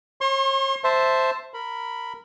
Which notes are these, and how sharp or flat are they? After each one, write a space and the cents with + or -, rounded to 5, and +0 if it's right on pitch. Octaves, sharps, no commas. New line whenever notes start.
C#5 -40 C6 +40
C5 +0 E5 +0 A5 +0
A#4 -15 B5 +0